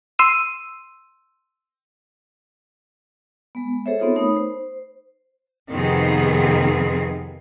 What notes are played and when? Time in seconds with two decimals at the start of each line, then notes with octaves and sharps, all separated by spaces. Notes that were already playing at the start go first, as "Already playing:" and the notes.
0.19 C6 E6 D#7
3.55 G#3 B3
3.86 G#4 A4 C5 C#5 E5
3.99 B3 C4 D#4 F4 A4 C#5
4.16 A3 D#4 A#4 C#5 B5 D#6
4.36 C5
5.70 F2 C3 D#3 B3 C4 G#4